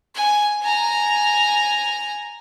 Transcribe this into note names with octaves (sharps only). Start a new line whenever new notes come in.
G#5
G#5 A#5